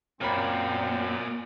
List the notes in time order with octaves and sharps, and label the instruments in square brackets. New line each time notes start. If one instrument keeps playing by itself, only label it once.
[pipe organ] F#2 [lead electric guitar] A#2 [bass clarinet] C4 [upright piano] A#4 C#5 B5